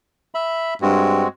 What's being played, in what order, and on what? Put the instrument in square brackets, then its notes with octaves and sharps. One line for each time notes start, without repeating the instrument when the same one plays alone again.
[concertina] E5 B5
[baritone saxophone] G2 [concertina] G#3 C4 F#4